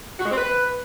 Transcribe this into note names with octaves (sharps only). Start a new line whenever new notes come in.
F#4
G#3
C4
B4